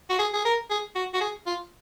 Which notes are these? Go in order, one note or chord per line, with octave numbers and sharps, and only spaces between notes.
F#4
G#4
G#4
A#4
G#4
F#4
F#4
G#4
F4